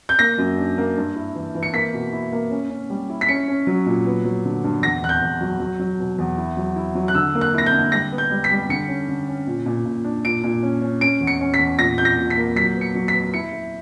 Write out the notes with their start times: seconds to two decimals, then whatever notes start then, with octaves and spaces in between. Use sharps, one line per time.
0.09 G6
0.19 A#3 A#6
0.38 F#2
0.58 D4
0.78 A#3
0.97 G2
1.16 E4
1.35 E3
1.55 E3
1.63 C#7
1.73 A#3 B6
1.93 B2
2.13 E4
2.33 A#3
2.51 C#4
2.70 C#4
2.90 G3
3.10 E4
3.21 B6
3.28 C#4 C#7
3.48 C#4
3.67 F#3
3.86 A#2
4.06 B3
4.25 F#3
4.45 D3
4.64 G2
4.83 E2 A#6
5.02 E2 F#6
5.09 G6
5.22 E2
5.41 F#3
5.60 F#3
5.79 F#3
6.00 B2
6.18 E2
6.38 E4
6.57 F#3
6.76 E4
6.95 F#3
7.08 F#6
7.15 D3 E6
7.35 A#3
7.41 F#6
7.54 E4 A#6
7.66 G6
7.74 D3
7.92 G3 A#6
8.12 B3
8.18 G6
8.31 G3
8.44 B6
8.51 G3
8.69 D3 C#7
8.88 C#4
9.08 D3
9.28 C#4
9.47 A#2
9.66 A#2
9.85 A#2
10.04 D4
10.24 A#2 D7
10.43 A#2
10.63 C#4
10.82 C#4
11.01 C#4 D7
11.21 E2
11.27 C#7
11.41 C#4
11.54 B6
11.60 E2
11.79 A#2 A#6
11.98 A#2 G6
12.05 A#6
12.18 A#2
12.30 B6
12.37 A#3
12.56 F#3 B6
12.76 B3
12.81 C#7
12.95 F#3
13.08 B6
13.14 B3
13.34 E4 C#7
13.53 E4